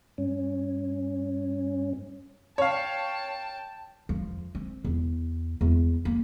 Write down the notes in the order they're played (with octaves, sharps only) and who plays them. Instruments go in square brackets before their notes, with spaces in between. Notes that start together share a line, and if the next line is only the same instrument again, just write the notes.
[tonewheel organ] G2 C#4
[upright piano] C#5 F5 [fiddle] G5 A5
[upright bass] F2
C4
E2
E2
A#3